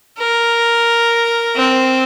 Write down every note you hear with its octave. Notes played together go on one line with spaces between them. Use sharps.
A#4
C4